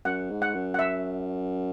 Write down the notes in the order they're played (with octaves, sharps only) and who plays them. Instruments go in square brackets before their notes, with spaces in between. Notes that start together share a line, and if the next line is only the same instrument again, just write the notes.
[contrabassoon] F#2 [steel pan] F#5
[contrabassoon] G#2
[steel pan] F#5
[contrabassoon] F#2
[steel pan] F#5
E5